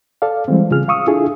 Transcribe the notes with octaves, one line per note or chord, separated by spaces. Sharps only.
A4 D5 F5
E3 G3 G#3 C4
C#3 F4 G#4 F6
F5 C#6 D#6 E6
D4 E4 F4 G#4 A4